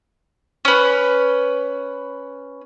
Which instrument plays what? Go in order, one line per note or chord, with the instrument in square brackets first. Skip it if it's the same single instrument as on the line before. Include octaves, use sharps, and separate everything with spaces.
[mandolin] C#4 B4